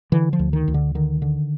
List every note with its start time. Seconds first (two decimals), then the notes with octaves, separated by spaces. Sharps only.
0.12 D3 E3
0.33 F3
0.39 D2
0.53 D#3
0.68 D2
0.74 D3
0.95 D3 D#3
1.22 D3